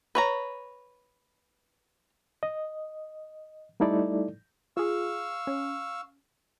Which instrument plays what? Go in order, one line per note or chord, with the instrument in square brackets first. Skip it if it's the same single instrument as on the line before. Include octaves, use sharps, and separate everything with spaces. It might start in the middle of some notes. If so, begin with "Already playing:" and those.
[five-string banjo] B4 C#5 A#5
[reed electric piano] D#5
G3 A3 D#4 E4 A4 D5
[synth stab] F4 G#4 [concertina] F5 C#6 E6
[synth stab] C#4